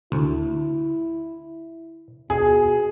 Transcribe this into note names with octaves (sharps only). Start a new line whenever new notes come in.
D2 E4
B2 G#4